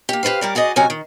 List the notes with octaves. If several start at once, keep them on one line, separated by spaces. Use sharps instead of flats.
A#3 G4
G4 A4 B4 C5 F5
G3 A#4 D5
F#4 G#4 D5 D#5
C3 F#3 C#4 D#4 G#5 A#5
D#3